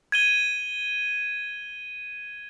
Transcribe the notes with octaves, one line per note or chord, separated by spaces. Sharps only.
G#6 D#7 G7